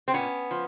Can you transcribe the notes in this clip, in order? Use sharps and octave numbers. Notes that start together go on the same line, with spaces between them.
C4
A#2 B3 C#4
F3